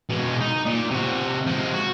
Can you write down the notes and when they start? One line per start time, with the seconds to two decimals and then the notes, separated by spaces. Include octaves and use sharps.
0.09 B2 G#3
0.41 D#4
0.66 A#2
0.91 C3 F#4
1.47 F3 G#3
1.73 F#4